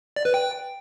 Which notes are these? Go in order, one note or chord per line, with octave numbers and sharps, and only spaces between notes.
D5
B4
G5